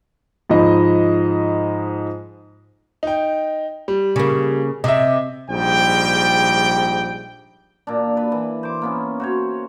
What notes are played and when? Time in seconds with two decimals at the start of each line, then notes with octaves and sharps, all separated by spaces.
0.50 G#2 F3 D#5 B5
3.03 D#4 G5
3.88 G3
4.16 C#3 A#3
4.84 C3 D#5 E5
5.50 A#1 G#2 G3 G5
7.87 A#2 D4
8.17 B4 B5
8.32 E3
8.63 C5 D6
8.82 A#3 B3 C#4
9.20 F#4 C5 C#5